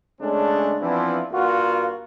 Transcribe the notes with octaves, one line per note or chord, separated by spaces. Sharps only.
C#3 G#3 A3 C#4 D4
E3 F3 B3 C4 D4 E4
G2 A#3 F4 F#4